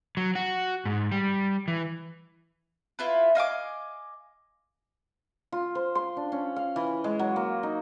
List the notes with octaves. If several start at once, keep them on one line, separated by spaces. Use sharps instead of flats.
F#3
F#4
G#2
G3
E3
E4 F4 B4
D#5 F5 G#5 D6
F4
C5
C6
D4
C#4
F5
E3
G#3
F#3
A#3
D#4